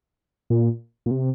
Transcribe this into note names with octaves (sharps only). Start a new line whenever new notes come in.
A#2
A#2
C3